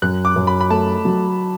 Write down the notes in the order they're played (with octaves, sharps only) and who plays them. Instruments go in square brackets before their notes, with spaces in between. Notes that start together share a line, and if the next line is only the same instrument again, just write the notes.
[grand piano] F#2 [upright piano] F#6
[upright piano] D6
[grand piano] F#2
[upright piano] B5
B5
[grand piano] A3 [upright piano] A5
[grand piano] F#3